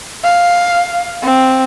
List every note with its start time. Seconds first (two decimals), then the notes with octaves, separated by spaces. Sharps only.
0.24 F5
1.23 C4